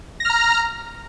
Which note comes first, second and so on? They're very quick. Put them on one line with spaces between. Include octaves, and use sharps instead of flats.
A#6 F6 A#5